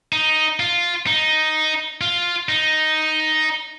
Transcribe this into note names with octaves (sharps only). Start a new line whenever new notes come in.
D#4
F4
D#4
F4
D#4